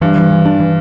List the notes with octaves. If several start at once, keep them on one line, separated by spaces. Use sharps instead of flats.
G2 E3
E3
E3
D4
E3